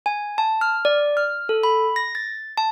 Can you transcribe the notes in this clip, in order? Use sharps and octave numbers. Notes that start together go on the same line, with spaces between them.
G#5
A5
F6
D5
F6
A4
B5
A#6
A6
A5